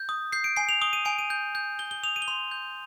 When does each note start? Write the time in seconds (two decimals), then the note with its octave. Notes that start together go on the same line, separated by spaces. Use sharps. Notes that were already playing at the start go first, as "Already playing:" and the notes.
Already playing: G6
0.09 D#6
0.32 G6 C7
0.44 D7
0.56 G#5 C7
0.69 F7
0.82 D#6 G7
0.93 D#7
1.05 G#5 D7
1.19 D#7
1.30 G6
1.55 G6
1.79 G6 G7
1.91 G7
2.03 D#6 F7
2.16 D#7
2.22 G7
2.28 C6 F7
2.51 G6